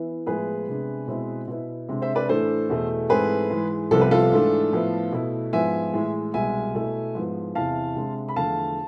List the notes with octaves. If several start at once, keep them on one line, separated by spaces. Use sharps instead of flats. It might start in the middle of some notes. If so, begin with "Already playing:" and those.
Already playing: E3 B3 E4
A2 F3 G#3 B3 E4 G#4 B4
C3 G#3 B3 D4
B2 G#3 C4 E4
B2 B3 E4
C3 G#3 D4
C5 E5
B4 D5
A2 E3 A3 D4 A4 C5
E2 B2 A3
G#2 E3 A3 C4 G#4 B4
G#2 E3 G#3
C2 C3 F3 B3 A4
B4
F4 A4
G#2 E3 A3 D4
A2 F3 B3 E4
B2 A3 E4
G#2 F3 B3 E4 E5 G#5
A2 E3 G#3
C2 B2 G#3 E5 G#5
B2 A3 E4
G#2 F3 B3 E4
E2 C3 E3 F5 A5
C3 G#3 D4
B5
E2 D3 F3 A3 F5 A5